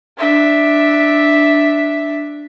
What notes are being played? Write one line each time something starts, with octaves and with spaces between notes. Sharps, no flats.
D4 E5